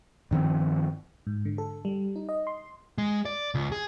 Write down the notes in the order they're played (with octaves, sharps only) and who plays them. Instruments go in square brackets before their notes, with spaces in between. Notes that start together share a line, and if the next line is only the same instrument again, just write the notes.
[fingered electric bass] G2 D#3 F3 C4
[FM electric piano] G#2
D3
A4
G3
D#4
D#5
C6
[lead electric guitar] G#3
D5
C#2
G#4